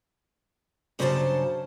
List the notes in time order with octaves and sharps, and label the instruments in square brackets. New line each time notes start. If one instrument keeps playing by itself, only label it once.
[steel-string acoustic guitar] G2 C#3 F#3 C5 G#5 A5